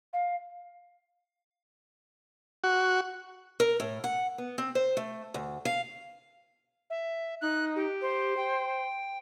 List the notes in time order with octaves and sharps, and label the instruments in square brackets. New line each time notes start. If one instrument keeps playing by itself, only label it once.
[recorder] F5
[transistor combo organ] F#4
[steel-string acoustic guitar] A#4
A2
F#5
B3
C4
C5
A3
D2
F5
[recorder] E5
[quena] D#4 [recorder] F#6
[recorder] G4
[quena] C5
[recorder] G5